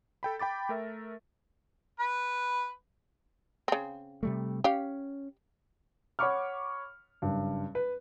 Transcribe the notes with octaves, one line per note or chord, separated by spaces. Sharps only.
A4 G5 B5
G5 B5 D6 A6
A3 A#4 E5
B4
C#3 C4
C3 G3 A3
C#4 G4 F5
C#5 F#5 B5 C#6 D6 F6
F#1 G2
B4